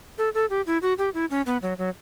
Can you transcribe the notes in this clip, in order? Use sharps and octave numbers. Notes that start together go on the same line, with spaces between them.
A4
A4
G4
E4
F#4
G4
E4
C#4
B3
F#3
F#3